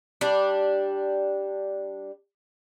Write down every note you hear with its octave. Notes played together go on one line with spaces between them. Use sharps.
G3 D4